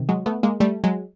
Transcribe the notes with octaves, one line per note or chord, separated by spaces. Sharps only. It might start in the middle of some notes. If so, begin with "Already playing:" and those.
Already playing: C3 D#3
F#3 G#3
A3 B3
G#3 A#3
G3 A3
F#3 G#3